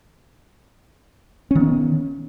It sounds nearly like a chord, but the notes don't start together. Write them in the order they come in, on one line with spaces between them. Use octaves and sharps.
C#4 D#3 B3